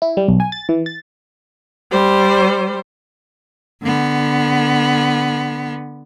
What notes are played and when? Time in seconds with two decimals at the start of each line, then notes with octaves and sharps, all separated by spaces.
0.02 E4
0.17 G3
0.28 B1
0.40 G#5
0.52 A6
0.69 E3
0.86 A6
1.91 G3 C5
3.82 D3 B3